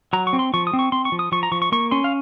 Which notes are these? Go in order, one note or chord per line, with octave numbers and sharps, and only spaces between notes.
F#3 A#5
C#6
C4
C6
F3 C#6
D#6
C4
C#6
C4 C6
C#6
F3
D#6
F3 C#6
A#5
F3 C#6
C#6
A#3 C#6
C#4 C6
F5